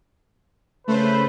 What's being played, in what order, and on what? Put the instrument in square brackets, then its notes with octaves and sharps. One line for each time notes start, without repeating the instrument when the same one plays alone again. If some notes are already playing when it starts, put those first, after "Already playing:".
[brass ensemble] C#3 B4 [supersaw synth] A3 C5